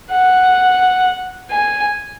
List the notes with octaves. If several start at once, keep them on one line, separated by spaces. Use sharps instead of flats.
F#5
G#5